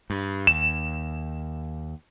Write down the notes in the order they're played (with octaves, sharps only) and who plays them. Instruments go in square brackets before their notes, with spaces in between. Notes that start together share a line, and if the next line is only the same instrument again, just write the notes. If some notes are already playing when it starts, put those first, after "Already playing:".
[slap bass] G2
[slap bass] D#2 [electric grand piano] E7